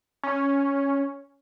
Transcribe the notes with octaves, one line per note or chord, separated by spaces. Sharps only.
C#4